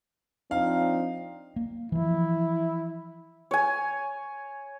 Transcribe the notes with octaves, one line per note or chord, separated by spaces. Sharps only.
F3 C4 D4 D#4 F5
A#3
E3 F3 E4
C#5 G#5